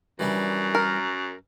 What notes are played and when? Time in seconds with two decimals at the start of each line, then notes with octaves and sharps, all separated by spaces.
0.19 F#2 E3 G3 D4
0.75 A#4